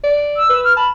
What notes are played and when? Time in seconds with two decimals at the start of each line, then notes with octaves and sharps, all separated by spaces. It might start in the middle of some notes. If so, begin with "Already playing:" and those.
0.04 D5
0.37 E6
0.50 B4
0.64 F6
0.77 A5 B5